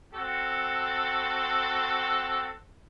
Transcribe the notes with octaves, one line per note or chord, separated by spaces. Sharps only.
C4 F#4 A4